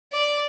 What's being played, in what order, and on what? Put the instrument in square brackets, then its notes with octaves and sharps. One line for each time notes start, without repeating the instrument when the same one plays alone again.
[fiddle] D5